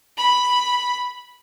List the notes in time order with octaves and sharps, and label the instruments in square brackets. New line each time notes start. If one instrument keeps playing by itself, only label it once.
[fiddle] B5